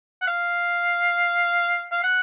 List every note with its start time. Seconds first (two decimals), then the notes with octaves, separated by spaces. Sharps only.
0.22 F#5
0.27 F5
1.92 F5
2.03 F#5